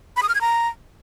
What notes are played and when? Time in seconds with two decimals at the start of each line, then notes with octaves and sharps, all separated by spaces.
0.17 B5
0.23 D#6
0.29 F6
0.35 G#6
0.41 A#5